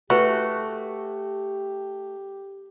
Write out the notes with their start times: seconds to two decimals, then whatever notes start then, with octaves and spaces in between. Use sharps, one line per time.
0.10 A3 E4 F#4 G4 B4